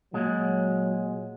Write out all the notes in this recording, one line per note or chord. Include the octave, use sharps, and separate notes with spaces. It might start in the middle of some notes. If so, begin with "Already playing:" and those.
A#2 F#3 G#3